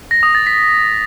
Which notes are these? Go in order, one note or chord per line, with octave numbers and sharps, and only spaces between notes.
A#6
D#6
A6
B6